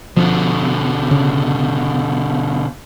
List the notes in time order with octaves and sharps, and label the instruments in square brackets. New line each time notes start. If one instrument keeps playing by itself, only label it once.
[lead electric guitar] B2 D3 [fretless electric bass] F3
[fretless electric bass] C#3